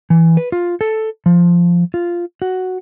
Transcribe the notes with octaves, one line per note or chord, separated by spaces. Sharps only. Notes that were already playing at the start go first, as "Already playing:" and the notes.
E3
B4
F4
A4
F3
F4
F#4